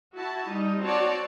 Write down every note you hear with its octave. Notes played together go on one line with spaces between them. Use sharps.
E4 F#4 A5
G3 D#4
C4 F#4 C#5 D5 A5